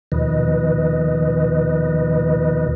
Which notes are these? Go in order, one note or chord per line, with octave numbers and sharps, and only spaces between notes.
D#2 B2 D#3 F3 B4 D#5